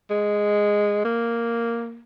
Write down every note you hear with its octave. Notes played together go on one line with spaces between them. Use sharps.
G#3
A#3